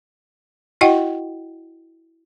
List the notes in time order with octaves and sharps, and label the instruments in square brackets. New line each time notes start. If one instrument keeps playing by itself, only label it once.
[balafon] E4 F#4 D#5 F#5 G5